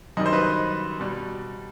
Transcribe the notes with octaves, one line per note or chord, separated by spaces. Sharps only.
F#2 D#3 G3 D#5
C5
B4 D#5
B2 G3